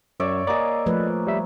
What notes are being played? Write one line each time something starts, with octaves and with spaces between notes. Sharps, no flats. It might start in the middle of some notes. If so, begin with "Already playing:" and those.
F#2 C#5 D5 E5
A#3 G#4 D5 D#5
F3 A3 B4
G3 E5